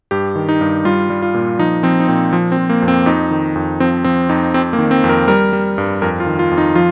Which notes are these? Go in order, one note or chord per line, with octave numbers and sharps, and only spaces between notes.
G2 G4
D#3
D#4
G2
G3 F4
G3
F4
A#2
F3 D#4
F3 C4
D#4
A#2 C4
F3
C4
F3
A#3
F2
C4
F2 D#4
D#3
F2
F3 C4
F3 C4
F2 D#4
F2 C4
A#3
D#3
C4
F2
A#4
G3 A#4
G3
G2
F2 A#4
F4
D#3
F4
F2
D#4
F3 F4